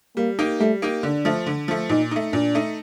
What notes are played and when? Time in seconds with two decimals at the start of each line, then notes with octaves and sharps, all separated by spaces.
0.17 G3 A#3
0.39 A#3 D#4 G4
0.60 G3 A3
0.82 A#3 D#4 G4
1.03 D3 D4
1.25 F3 A3
1.46 D3
1.68 F3 A3
1.89 A#2 D#4
2.11 A3 D#4
2.33 A#2 D4
2.55 A3 D#4